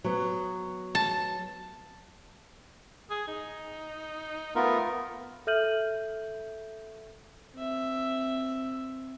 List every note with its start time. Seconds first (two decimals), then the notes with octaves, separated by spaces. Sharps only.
0.04 F#3 B3
0.95 A5
3.11 G#4
3.27 D#4
4.55 A3 B3 F4 A#4
5.47 A4 E5 F6 G6 D#7 F#7
7.55 C4 E5